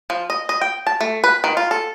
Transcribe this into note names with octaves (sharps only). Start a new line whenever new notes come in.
F3
D#5
D#5
G5
A5
A3
B4
D#3
F4
A4